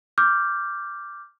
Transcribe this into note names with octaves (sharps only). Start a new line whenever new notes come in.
D6 F6 G6